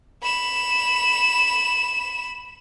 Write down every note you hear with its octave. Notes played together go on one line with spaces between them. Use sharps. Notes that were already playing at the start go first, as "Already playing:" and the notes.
B5 E7